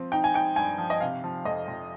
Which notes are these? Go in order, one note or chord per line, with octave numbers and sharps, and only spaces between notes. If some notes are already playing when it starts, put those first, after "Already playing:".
Already playing: F3 C4
D#4 G5
G#5
D#4 G5
G2 G#5
F3
D#5
C3 F5
F3
F2 D#5
F2